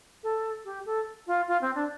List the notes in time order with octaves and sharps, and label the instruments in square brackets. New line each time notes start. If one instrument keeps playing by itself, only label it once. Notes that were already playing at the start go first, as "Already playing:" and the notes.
[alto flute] A4
G4
A4
F4
F4
C4
D4